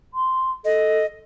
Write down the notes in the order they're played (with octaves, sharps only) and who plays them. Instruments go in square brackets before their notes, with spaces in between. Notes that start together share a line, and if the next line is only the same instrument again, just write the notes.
[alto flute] C6
[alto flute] A4 [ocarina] D#5